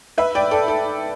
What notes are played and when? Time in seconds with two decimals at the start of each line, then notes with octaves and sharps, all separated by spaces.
0.18 B4 E5
0.35 D5 G5
0.51 A4 D5
0.68 A4